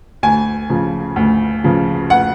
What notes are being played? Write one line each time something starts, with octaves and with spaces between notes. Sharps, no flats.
D2 G#5
C#3 F3
D2
C#3 F3
F#5